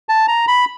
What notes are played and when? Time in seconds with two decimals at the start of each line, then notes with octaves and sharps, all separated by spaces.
0.09 A5
0.28 A#5
0.48 B5